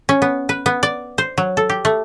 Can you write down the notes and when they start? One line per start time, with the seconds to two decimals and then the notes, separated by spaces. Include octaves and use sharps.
0.09 C#4
0.22 B3
0.49 B4
0.66 B3
0.83 D5
1.18 C5
1.38 F#3
1.57 A4
1.70 G4
1.85 A3